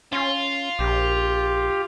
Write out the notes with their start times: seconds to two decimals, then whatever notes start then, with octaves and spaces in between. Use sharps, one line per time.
0.13 C#4 F4
0.79 A#1 G4